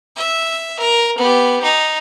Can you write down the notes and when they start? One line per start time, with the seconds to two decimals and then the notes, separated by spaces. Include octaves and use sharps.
0.17 E5
0.79 A#4
1.18 B3 G4
1.63 D#4